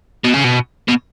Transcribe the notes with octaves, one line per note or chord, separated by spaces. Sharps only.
B2
C#3
B2
B2